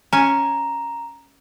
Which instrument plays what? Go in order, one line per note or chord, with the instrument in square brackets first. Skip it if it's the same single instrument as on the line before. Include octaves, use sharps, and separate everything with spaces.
[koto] C#4 G#5 [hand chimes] A#5